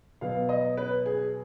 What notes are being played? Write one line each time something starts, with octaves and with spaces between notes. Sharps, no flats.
B2 F#3 B3 F5
D#5
B4
G#4